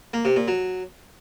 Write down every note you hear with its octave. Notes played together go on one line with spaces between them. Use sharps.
A#3
C3
A#2
F#3